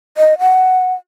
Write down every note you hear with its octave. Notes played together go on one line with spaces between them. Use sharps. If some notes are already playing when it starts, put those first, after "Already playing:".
D#5
F#5